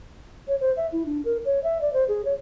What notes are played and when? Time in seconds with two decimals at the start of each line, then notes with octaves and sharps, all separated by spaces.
0.48 C#5
0.61 C5
0.77 E5
0.92 E4
1.06 D4
1.25 A#4
1.45 C#5
1.64 E5
1.81 D5
1.93 C5
2.08 G#4
2.25 C#5